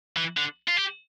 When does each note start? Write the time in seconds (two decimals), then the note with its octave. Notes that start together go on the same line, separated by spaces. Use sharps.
0.17 E3
0.37 D3
0.68 F4
0.77 G4